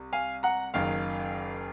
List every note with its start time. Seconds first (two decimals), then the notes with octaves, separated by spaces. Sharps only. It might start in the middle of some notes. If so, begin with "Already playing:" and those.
Already playing: C2
0.13 F5 G#5
0.43 F#5 A#5
0.74 F#1 F#2 D#3 F5